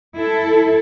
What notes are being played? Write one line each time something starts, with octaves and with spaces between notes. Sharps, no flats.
E4 A4